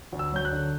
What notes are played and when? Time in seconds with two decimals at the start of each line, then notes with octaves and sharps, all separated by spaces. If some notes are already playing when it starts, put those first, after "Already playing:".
0.12 D2
0.19 E6
0.33 F#3 G6
0.45 F#6
0.52 D3